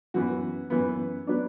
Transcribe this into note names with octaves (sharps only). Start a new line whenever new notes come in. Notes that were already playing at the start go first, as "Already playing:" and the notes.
F#2 E3 B3 F#4
F#2 E3 B3
F#3 B3 D4